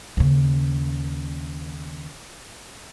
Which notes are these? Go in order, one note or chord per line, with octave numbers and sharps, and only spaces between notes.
D#2 C#3